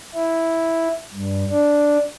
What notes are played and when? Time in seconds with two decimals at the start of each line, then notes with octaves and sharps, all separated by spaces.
0.15 E4
1.14 G2
1.50 D4